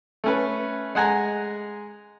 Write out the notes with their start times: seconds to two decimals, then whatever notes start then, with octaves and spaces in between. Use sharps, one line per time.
0.24 A3 C#4 B4
0.95 G#3 F#5 G#5 A#5